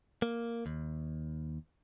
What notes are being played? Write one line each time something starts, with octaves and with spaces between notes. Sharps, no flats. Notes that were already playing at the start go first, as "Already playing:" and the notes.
A#3
D#2